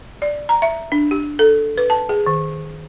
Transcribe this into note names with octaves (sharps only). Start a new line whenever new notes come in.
D5
A#5
E5
D4
G4
A4
B4
A5
G#4
D#3